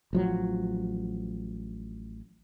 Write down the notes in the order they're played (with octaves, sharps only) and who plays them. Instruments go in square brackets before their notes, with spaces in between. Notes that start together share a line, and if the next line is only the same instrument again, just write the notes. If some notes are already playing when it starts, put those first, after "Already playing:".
[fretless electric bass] A1 F3 F#3